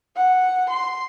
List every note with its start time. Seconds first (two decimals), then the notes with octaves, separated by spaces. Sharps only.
0.16 F#5
0.70 C6